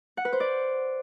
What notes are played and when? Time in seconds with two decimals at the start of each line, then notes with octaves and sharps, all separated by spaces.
0.17 F#5
0.25 B4
0.33 C5
0.40 D5